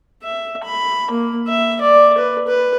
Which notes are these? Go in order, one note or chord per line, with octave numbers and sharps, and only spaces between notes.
E5
B5
A#3
E5
D5
B4
B4